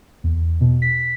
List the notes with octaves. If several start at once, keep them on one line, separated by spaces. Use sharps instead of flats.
E2
B2
B6